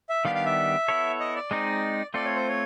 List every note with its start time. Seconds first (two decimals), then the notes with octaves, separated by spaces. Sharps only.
0.09 E5
0.25 D#3 G3 B3 D4 G4 F5
0.35 F5
0.45 E5
0.88 B3 E4 A4 C#5
1.20 D#5
1.36 D5
1.51 G#3 C4 D#4
2.14 A3 C4 F4 A4 D5
2.25 C#5
2.36 C5
2.48 C#5